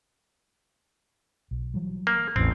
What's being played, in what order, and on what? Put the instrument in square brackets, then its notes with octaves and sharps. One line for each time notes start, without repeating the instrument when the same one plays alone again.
[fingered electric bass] B1
E3 F#3 G3
[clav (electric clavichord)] A#3
[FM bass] A1 [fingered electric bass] E2 A2 [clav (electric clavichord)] C4